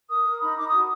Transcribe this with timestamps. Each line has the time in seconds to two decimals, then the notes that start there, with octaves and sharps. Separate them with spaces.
0.09 A#4 D#6
0.25 A#4
0.41 D#4 B5
0.57 D#4 D6
0.68 F#4 D#6